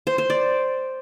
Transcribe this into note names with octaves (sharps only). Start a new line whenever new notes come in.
C5
C5
D5